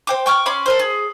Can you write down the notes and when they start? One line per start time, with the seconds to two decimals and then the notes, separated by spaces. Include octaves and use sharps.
0.07 C5 G5 D6
0.26 G5 C#6 D6 F6
0.46 C#4 B5 C6 D6
0.66 A4 A#4 C5
0.79 G#4